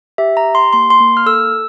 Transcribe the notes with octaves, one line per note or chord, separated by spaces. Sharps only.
G4 E5
A#5
G4
C6
A#3 C6
C6
A#3
F6
A4 E6